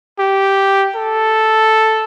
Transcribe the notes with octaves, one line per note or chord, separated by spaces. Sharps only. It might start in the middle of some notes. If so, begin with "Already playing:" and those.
G4
A4